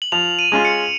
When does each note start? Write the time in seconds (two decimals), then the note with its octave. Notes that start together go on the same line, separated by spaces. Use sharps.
0.02 F#7
0.12 F3 F7
0.39 D#7
0.52 G#3 C#4 F4
0.65 C#7